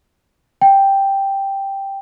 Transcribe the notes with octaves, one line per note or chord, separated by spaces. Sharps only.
G5